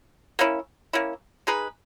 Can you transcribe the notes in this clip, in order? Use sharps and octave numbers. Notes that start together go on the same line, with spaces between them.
A#3 C#4 E4
A#3 C#4 E4
G#3 D#4 G#4 B4